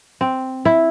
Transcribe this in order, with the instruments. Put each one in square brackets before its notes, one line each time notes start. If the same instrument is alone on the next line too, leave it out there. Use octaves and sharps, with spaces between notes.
[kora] C4
E4